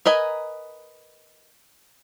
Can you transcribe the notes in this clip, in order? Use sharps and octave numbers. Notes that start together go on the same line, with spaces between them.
A#4 B4 D#5 G#5